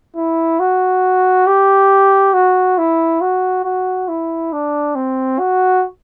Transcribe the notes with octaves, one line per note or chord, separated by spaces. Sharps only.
E4
F#4
G4
F#4
E4
F#4
F#4
E4
D4
C4
F#4